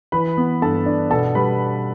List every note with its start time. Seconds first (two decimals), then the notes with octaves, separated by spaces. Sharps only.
0.12 E3 B4 B5
0.37 B3
0.62 G2 A4 A5
0.86 D4
1.10 B2 A4 A5
1.35 G3 B4 B5